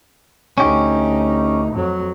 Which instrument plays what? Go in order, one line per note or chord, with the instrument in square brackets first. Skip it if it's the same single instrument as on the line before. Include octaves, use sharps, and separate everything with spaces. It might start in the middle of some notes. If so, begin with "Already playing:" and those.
[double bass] D2 D#4 [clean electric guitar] C#4 G4
[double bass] F2 F#3